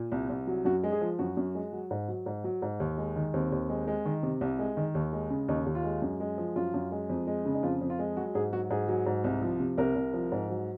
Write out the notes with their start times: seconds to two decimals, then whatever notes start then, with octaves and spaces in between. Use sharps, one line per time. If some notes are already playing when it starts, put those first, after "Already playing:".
Already playing: A#2
0.12 C2
0.30 C2
0.47 F#3
0.65 F#2 F#4
0.83 G#3
0.92 G#4
1.01 F3
1.19 F#2 F#4
1.37 F#2
1.55 G#3
1.73 F#3
1.91 G#2
2.08 F#3
2.26 G#2
2.44 F#3
2.62 G#2
2.80 D#2
2.98 G#3
3.16 D#3
3.34 D#2 C4
3.52 D#2
3.69 G#3
3.87 G#3
4.06 D#3
4.23 C3
4.41 C2
4.59 G#3
4.77 D#3
4.95 D#2
5.13 G#3
5.30 C#3
5.48 D#2 D#4
5.66 D#2
5.75 F4
5.84 G#3
6.02 F#2
6.20 G#3
6.38 F3
6.56 F#2 F4
6.74 F#2
6.92 G#3
7.09 F2
7.27 G#3
7.46 C#3
7.54 D#4
7.63 F2 F4
7.81 F2
7.90 F4
7.99 G#3
8.17 F#3 F#4
8.35 G#2 G#4
8.53 F#3 F#4
8.70 G#2 G#4
8.88 F#3
9.06 G#2
9.24 C2
9.42 F3
9.60 C3
9.78 C2 A#4
9.96 C2
10.14 F3
10.32 G#2
10.49 F#3